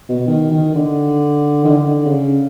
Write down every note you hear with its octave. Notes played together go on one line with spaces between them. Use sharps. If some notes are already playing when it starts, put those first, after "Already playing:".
B2
D#3
D#3
D3
D#3
D3
C#3